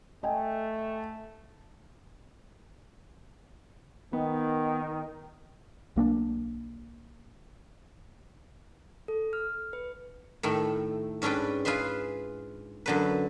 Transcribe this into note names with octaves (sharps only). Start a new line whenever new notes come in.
A3 D#5 G5 G#5
D#3 B3
B1 A#3 C4 D4
A4
F6
B4
A2 D#3 A3
G#2 C#4 D4 B4 G5
F4 G#4 B4 E5 C6
F#2 D3 B4